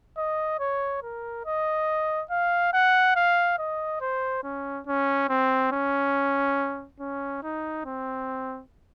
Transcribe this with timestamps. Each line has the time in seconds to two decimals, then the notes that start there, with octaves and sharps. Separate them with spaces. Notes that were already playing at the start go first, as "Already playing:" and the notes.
0.17 D#5
0.60 C#5
1.03 A#4
1.46 D#5
2.31 F5
2.73 F#5
3.16 F5
3.59 D#5
4.01 C5
4.43 C#4
4.87 C#4
5.29 C4
5.72 C#4
7.00 C#4
7.43 D#4
7.85 C4